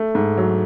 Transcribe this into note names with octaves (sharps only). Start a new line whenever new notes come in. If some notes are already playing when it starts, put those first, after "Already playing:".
Already playing: A3
G#2
F#3